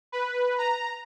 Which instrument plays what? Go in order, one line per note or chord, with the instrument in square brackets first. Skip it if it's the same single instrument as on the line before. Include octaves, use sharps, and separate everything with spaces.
[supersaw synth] B4
A#5